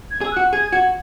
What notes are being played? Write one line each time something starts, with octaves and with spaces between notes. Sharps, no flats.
G#6
G#4 E6
F#4 F#6
G#4 G#6
F#4 G#6